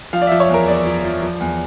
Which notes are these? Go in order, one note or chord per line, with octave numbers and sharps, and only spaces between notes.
F3 F5
D5
F3 E5
C#5
E2 A#4
E2 D5
F3
F3
F3
E2